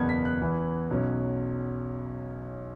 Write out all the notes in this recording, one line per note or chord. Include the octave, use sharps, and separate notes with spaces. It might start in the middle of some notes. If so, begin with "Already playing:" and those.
Already playing: F#1 E2 B2 B3 G#6
B6
F#6
E2 E3 B3
B1 B2 F#3 C#4